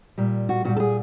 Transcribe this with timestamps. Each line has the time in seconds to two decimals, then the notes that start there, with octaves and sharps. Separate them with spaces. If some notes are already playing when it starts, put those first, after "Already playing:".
0.18 A#2 G3
0.49 F#4
0.65 A#2 G3 F#4
0.76 A4
0.80 G#4